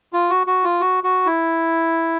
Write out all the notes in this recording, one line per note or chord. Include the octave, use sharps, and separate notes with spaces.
F4
F#4
F#4
F4
F#4
F#4
E4